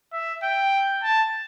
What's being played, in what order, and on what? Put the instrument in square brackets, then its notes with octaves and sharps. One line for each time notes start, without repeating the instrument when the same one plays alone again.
[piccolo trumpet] E5
G5
A5